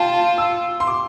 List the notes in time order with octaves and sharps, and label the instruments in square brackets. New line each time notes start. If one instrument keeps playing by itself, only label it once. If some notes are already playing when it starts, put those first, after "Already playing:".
Already playing: [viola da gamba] F4 [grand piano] G5 A5
[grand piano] E6
C6
D6